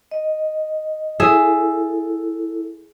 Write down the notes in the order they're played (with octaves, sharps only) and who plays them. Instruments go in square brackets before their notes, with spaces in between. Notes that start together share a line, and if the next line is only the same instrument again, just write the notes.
[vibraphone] D#5
[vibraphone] E4 A4 [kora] G#4 E5